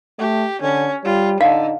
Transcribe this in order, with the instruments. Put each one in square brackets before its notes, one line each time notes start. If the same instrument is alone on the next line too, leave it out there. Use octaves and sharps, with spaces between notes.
[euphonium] A3 [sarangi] G4
[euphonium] D3 [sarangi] C#4
[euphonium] G3 [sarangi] F4
[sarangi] D3 [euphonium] D#4 [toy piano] F5